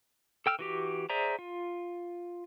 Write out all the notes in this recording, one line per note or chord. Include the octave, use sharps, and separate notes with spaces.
A4 G5 E6 F6
E3 F#4 G4
G#4 C5 D5 E5 A#5
F4